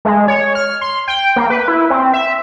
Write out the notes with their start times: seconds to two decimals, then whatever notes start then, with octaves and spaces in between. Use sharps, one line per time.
0.05 G#3
0.28 C#5
0.55 F6
0.81 C6
1.08 G5
1.36 A#3
1.50 B4
1.68 E4
1.90 C4
2.14 E5